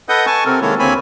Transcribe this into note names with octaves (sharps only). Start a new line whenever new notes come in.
A4 B4 D#5 F#5 D#6 G6
G#5 A5 C#6
C3 C4 A4 A#4
D#3 G#3 A#3 E4 A4 C#5
D2 A#3 C4 C#5 G#5 B5